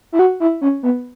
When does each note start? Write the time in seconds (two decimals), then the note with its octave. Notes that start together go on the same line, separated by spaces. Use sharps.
0.12 E4
0.19 F#4
0.40 E4
0.61 C#4
0.83 B3